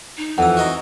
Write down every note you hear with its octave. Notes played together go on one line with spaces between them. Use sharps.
D#4
F2 E3 F#5 E6
F#4 D#5 A#5